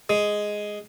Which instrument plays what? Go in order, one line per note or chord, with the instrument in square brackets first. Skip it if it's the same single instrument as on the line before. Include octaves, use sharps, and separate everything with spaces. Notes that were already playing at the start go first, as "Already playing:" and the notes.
[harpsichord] G#3